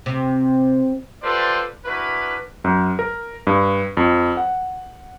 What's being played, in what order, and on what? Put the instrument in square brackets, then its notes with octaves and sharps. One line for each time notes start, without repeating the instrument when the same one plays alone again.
[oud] C3
[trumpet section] F4 G4 A4 B4 C5 D5
D4 E4 F#4 A#4 B4
[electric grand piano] F#2
A#4
G2
F2
F#5